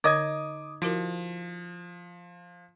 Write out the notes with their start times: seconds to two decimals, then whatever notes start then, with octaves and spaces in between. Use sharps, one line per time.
0.04 D3 D#4 C#5 D#5 D6 D#6 G#6
0.82 F3 E4 F#4 A#4